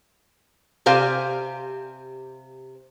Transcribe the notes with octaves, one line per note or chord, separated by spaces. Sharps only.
C3 G4 C5 F5 G#5